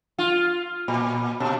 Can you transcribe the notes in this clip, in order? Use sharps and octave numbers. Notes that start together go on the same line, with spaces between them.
F4
A#2
B2